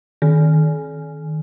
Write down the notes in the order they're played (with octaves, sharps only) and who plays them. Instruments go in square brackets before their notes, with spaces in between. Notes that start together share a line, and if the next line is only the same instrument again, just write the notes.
[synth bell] D#3